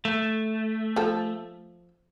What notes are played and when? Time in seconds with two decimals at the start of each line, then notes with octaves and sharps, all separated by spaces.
0.05 A3
0.96 F3 A4